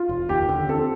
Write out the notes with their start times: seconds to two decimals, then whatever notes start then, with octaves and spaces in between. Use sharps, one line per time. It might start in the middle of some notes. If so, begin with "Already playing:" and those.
Already playing: F4
0.09 F1
0.29 D#2 G4
0.49 D3
0.69 C4 A4